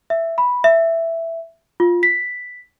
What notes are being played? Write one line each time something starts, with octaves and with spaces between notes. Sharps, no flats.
E5
B5
E5
F4
B6